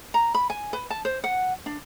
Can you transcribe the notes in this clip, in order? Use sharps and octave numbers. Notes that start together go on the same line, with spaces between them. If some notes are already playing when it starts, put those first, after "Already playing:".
A#5
B5
G#5
B4
A5
C5
F#5
D4